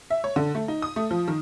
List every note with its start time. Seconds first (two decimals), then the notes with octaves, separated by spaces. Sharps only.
0.10 E5
0.24 C#5
0.36 D3
0.55 A3
0.68 D#4
0.82 D#6
0.96 A3
1.11 F3
1.28 D#3